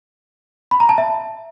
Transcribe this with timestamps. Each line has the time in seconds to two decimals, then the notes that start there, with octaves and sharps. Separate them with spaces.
0.71 B5
0.80 A#5
0.89 A5
0.98 E5